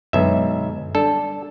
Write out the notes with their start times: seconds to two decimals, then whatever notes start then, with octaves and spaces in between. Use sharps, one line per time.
0.13 B1 F#2 D3 G#3 E5
0.95 G3 D4 A4 D5